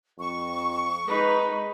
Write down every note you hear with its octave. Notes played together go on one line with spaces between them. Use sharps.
F2 C#6
G#3 D#4 B4